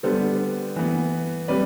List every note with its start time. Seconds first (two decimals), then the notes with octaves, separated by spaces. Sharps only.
0.03 D3 G3 B3 A4 C5
0.76 E3 B3
1.48 C3 G3 B4 D5